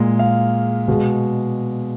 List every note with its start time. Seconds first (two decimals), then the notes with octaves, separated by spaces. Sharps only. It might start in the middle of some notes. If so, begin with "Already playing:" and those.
Already playing: A#2 G#3
0.19 F5
0.88 B2 G#3